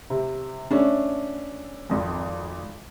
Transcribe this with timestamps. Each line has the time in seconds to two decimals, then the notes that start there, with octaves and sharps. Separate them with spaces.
0.10 C3
0.71 A3 C#4 D4
1.90 G#1 F2